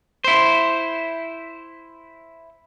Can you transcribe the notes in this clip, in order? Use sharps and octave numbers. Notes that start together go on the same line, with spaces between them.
E4 C5